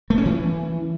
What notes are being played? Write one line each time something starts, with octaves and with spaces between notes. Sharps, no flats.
A3
C#4
E3